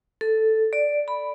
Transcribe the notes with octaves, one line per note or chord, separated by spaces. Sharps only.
A4
D5
B5